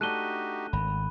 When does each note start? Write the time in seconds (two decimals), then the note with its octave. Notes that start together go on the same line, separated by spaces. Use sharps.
0.01 A3 D4 D#4 F#4 G4 F#6 D#7 G7
0.73 G#1 B5